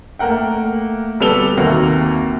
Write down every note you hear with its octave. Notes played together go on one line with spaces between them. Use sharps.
A3 A#3 A#4 F#5 G5
D2 G3 B3 A4 F7 G7
D#2 C3 A#3 F#4